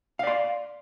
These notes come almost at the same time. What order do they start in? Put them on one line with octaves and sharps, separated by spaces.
F5 D5 C6